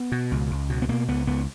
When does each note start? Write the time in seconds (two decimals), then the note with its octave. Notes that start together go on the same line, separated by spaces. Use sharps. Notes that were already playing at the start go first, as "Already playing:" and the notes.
Already playing: B3
0.12 B2
0.31 C#2
0.51 C#2
0.70 B2
0.82 B3
0.88 B2 A#3
1.08 C#2 B3
1.27 C#2 B3